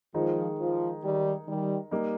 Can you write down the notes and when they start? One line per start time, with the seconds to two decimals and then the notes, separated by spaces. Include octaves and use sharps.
0.14 D#3 F3 G#3 D#4 G#4
0.59 F3
1.02 D#3 G3
1.47 D#3 G3
1.91 G3 A#3 D#4